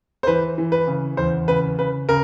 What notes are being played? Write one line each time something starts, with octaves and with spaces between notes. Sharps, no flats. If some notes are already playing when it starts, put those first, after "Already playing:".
C5
E3 B4
E3
B4
C#3
E2 C5
C#3 B4
C#3 B4
C#3 A#4